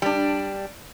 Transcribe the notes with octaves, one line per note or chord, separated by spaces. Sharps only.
G3 D4